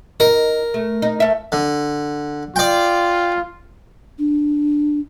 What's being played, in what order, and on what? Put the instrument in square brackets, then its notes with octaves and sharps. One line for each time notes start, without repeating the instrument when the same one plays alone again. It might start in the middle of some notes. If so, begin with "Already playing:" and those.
[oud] D#4 [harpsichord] A#4
[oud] A3
D#4
A3 E5
[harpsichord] D3
[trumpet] F4 [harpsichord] D5 G5
[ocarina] D4